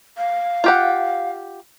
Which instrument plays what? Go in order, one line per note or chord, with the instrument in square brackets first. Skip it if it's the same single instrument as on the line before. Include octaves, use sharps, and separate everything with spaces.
[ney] F5
[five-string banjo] F4 G4 F#5